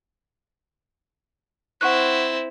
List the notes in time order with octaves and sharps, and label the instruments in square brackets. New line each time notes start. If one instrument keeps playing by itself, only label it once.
[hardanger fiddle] C4 E4 [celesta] F#5 C#6 F#6